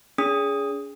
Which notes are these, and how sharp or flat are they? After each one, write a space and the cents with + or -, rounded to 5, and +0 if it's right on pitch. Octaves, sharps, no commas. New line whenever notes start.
C#4 +45 G#4 +0 D#6 +0